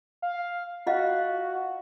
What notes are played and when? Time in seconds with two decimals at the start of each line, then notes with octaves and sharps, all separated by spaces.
0.22 F5
0.87 F4 F#4 D#5 F5